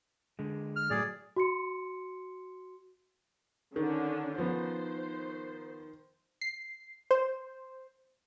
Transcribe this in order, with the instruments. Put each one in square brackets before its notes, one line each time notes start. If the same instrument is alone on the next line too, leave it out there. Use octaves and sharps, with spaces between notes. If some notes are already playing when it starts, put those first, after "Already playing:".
[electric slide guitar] D3 G#3
[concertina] F6
[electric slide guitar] A2 F#3 A3 [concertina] G#4 D5
[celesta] F#4 C6 C#7
[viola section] D3 C#4 D4 [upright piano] D#3
[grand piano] F3 B3 [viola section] C5
[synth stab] C7
C5